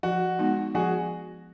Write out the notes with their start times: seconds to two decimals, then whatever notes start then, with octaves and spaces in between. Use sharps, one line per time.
0.03 F3 F#4
0.39 G#3 B3 D#4
0.75 F3 F#4 G#4